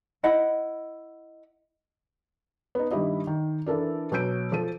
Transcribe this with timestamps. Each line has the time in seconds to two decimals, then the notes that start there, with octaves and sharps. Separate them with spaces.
0.23 E4 D#5 F#5 B5
2.75 B3 D#4
2.91 G2 D#3 E4 G4 D#5
3.27 D#3
3.66 E3 D4 A4 A#4 D5
4.12 B2 F#3 E6 G6 D7
4.52 F3 A4 D#7